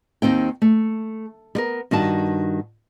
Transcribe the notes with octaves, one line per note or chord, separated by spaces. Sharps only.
D#2 D#3 C4 G5
A3
G3 B3 A#4
G2 D#3 F#4 A5